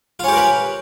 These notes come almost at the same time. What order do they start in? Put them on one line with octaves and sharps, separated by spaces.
F4 C#4 G4 A#4 B4